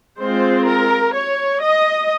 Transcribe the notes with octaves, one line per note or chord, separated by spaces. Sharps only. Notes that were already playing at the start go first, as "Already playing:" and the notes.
G#3 C4 F4 C5
A#4
C#5
D#5